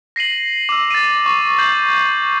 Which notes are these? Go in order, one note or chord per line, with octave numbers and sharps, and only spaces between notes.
A#6 C7 D#7 F#7
D6 E6
A6 D#7
C#6
G6 C7 F#7